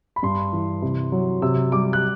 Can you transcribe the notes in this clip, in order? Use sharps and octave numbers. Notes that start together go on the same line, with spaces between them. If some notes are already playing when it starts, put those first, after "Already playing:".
B5
G2 C6
E3
C3
F#3
C3 E6
G3 D6
F#6